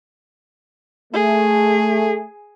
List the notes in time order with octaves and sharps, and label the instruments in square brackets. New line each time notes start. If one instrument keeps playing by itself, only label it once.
[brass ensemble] A3 [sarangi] G#4